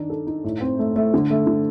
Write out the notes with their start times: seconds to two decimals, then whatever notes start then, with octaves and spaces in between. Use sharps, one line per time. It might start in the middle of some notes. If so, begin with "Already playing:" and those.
Already playing: D#3 D4 D#4
0.10 A4
0.27 D#4
0.44 A2
0.61 C4
0.79 A3
0.96 A3
1.14 D3
1.30 A3
1.47 D3